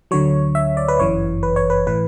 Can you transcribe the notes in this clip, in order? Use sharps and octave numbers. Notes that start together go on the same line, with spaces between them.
D2 D3 F#3 C#5
E5
D5
B4
G1 F#2 E3 C#5
B4
C#5
B4
A2 E3 B4